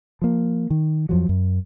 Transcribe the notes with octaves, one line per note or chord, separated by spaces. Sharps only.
F3 A#3
D#3
F2 F3 F#3
F#2